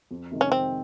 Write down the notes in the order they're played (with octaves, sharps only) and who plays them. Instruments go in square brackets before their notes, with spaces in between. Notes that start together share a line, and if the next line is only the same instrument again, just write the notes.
[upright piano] F2
C3 D#3 G#3
[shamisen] C#4
[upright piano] F2 [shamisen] C4